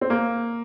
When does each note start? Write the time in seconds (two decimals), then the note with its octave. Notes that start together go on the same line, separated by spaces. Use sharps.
0.01 C4
0.10 A#3